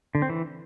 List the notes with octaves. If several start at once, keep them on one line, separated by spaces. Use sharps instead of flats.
D3
C4
E3